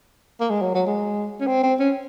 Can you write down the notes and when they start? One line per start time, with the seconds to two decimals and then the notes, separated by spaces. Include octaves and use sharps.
0.40 A#3
0.50 G#3
0.62 F#3
0.74 F#3
0.87 G#3
1.40 C#4
1.47 C4
1.63 C4
1.79 C#4